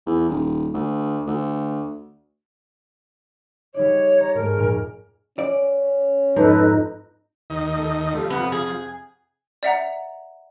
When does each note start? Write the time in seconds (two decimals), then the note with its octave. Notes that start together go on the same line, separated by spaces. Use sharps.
0.07 E2
0.29 D#1
0.74 D2
1.27 D2
3.74 G3 D#4 C#5 D5
4.21 A#5 A#6 C#7
4.35 G#2 A3 A#4
4.57 F1 A#2 F6
5.39 C#4 D5
6.36 F2 G#2 F3 D#4 A4 B4
7.50 D#2 D#3 D#5
7.77 A3
8.13 F3 G3 A3
8.30 F2 C3 B3
8.52 G#4
9.63 D5 E5 F#5 A#5